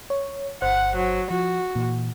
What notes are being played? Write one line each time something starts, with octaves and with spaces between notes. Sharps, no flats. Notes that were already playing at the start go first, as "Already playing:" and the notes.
C#5
G1 C5 F#5 F#6
F#3
F3 F#4
A#2 E3